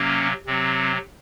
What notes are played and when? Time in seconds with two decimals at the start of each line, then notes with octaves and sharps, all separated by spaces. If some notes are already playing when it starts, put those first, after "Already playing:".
Already playing: C3 F#3 A#3 C#4
0.46 C3 F#3 C4